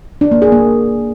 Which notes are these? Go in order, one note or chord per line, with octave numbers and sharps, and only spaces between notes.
D4
A#3
G#4
A#3